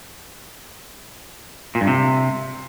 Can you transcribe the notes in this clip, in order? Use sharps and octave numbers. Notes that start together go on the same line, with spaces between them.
A#2
G2
C3